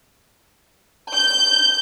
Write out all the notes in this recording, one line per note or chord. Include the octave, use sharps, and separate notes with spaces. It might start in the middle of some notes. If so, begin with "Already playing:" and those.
G6